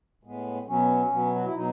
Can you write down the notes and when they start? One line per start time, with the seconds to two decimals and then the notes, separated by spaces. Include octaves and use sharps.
0.23 A2 G#3 B3
0.68 B2 F#3 B3 C#4
1.11 B2 F#3 B3
1.35 F#4
1.45 E4
1.54 B2 F#3 D#4